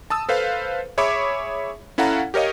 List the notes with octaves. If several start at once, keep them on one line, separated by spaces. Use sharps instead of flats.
A5 D#6 E6
A4 B4 C5 F5
G#4 C#5 E5 B5 C#6 D6
C#4 E4 A4 F5 F#5 A#5
G4 A#4 C#5 D#5 F5